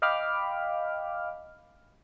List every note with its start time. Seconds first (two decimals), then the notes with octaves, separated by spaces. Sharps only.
0.02 D#5 F5 G5 B5 D6 F6